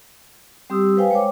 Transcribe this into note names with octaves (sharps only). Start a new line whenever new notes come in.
G3 C4 G4 D#6 E6
B4 C5 F5 G5 G#5
G#3 C5 C#5 G5 D6